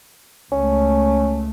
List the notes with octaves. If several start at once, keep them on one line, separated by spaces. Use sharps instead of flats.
C#2 A3 C#4